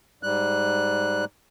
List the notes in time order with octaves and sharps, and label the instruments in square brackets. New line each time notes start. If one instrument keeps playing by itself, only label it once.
[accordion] G#2 G3 F#6